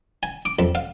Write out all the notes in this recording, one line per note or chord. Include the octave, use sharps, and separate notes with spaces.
G#5
D6
F2
F5